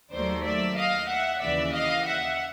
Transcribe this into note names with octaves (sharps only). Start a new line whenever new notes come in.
D#2 D#3 F#3 A3 C5 D5
D5 E5
D#5 F5
E5 F#5
D#2 C#3 E3 D5 E5
D#5 F5
E5 F#5